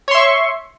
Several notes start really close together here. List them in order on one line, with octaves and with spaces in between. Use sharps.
C#5 C6 E5 C#6